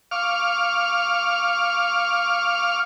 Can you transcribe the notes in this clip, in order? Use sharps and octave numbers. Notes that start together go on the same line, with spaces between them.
F5 C#6 D6 F6